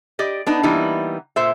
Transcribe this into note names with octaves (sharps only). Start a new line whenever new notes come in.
G4 D5 D#5
B3 D4 D#4
E3 G3 A#3 B3 D#4
A#2 C5 E5